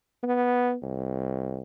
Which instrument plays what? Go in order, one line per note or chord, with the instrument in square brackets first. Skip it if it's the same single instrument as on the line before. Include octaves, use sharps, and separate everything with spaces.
[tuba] B3
C2